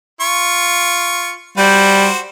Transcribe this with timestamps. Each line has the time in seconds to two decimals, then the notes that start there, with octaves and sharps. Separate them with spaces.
0.21 F4 C#6
1.58 G3 F#4 C5